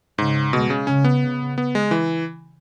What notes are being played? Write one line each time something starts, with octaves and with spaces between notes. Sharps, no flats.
G#2 C#3
B2 G#3
C#3
C#3 C#4
B3
C#3
B3
G#3
E3